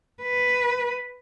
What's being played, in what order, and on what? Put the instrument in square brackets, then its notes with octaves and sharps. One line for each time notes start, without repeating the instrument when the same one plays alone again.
[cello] B4